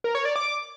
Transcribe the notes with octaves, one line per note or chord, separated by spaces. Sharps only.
A#4
C#5
D5
D6